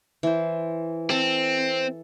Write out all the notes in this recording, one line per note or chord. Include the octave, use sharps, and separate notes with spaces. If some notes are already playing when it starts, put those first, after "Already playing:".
E3 C5
C4 A4 A5